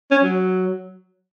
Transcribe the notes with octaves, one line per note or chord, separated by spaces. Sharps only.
C#4
F#3